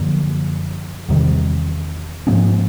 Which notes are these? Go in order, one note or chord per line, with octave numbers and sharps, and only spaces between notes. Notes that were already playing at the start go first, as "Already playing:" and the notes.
Already playing: F#2 D3 F3 A#3
E2 C3 D#3 G3
G#2 F3 A#3 C#4